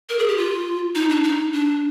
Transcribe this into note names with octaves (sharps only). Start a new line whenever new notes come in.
A#4
G#4
G4
F4
D#4
D4
D#4
D4